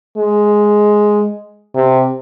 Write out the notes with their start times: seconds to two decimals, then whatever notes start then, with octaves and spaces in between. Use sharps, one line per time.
0.18 G#3
1.76 C3